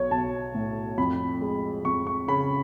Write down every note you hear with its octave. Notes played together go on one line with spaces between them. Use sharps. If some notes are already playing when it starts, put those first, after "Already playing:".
Already playing: B1 F#3 C#5
B1 A5
A2
F2 B5
G#3
F2 C#6
C#6
C#3 B5